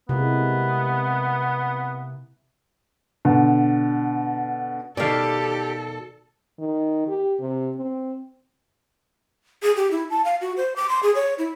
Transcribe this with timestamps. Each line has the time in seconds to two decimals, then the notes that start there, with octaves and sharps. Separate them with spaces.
0.09 C3 G#3 A#3 B3 E4
3.25 B2 D3
4.97 B2 D#3 G4 A4 D5 F5
6.59 D#3
7.08 G4
7.40 C3
7.77 C4
9.62 G#4
9.76 G4
9.91 E4
10.10 A5
10.25 F5
10.41 F#4
10.57 C5
10.76 D6
10.89 C6
11.03 G#4
11.15 C#5
11.39 E4